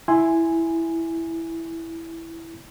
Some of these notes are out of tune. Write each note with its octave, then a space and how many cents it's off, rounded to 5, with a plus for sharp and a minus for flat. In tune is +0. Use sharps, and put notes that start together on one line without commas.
E4 +0 G#5 +0 C6 +0